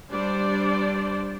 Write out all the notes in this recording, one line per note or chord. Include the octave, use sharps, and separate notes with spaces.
G3 D4 C5 D5